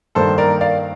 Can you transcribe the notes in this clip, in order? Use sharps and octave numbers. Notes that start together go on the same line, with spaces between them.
G2 D#3 A#3 D4 A4 C5
A#4 D5
D5 F5